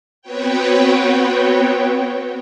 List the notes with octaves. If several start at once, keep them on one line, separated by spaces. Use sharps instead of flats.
B3 C4 F#4 B4 C#5 G5